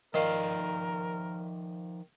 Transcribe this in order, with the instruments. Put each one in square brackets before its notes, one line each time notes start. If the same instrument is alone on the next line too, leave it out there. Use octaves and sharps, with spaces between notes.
[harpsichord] D#3 F5 [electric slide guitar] F3 D#4 D5 [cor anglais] A#4